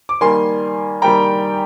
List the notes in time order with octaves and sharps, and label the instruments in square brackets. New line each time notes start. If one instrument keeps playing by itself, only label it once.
[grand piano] D6
D#3 G3 A#3 G#5 C6
D#3 G3 A#3 G5 A#5